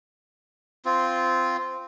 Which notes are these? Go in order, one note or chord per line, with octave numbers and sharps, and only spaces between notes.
C4 F4